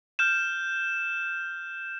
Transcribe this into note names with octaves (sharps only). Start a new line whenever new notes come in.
F6 G6 E7